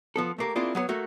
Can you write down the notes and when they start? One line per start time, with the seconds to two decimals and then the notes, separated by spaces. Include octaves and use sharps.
0.16 F3 B3 A4
0.38 A3 A#3 G4
0.55 A#3 C4 D4 E4 F4 G#4
0.75 F#3 B3 B4 C#5
0.89 A3 A#3 F#4